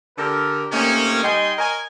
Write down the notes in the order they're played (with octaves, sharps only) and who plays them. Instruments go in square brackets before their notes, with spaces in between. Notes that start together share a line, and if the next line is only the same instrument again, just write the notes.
[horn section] D3 G4 A4 A#4
C3 D#3 A3 A#3 C#4
G3 D#4 D#5 G5 G#5 C6
A#4 C#5 D#5 G#5